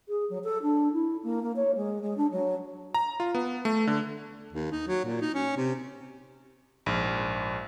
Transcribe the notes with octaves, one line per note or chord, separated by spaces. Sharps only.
G#4
F#3
A4
D4
E4
A#3
A#3
C#5
G#3
G#3
D4
F#3
A#5
F4
B3
A3
D3
D#2
D#4
F#3
A#2
D#4
C#4
C3
A#1 G#2